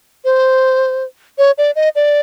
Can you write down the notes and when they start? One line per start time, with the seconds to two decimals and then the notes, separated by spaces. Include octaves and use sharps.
0.24 C5
1.38 C#5
1.58 D5
1.76 D#5
1.95 D5